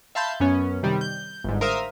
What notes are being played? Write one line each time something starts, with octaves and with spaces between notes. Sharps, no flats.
E5 F5 A5 B5 C6 G6
F#2 B3 C#4
C3 D#3 G3
G6
G1 G#2
A#4 C5 E5 F5 D#6 F6